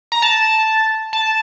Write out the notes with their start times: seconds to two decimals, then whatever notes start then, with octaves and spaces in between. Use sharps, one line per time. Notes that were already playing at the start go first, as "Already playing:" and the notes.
0.12 A#5
0.22 A5
1.13 A5